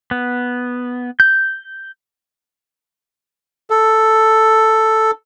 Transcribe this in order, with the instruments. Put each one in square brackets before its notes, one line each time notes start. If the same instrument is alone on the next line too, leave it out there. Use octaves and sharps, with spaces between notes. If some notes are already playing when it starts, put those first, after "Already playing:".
[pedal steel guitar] B3
G6
[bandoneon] A4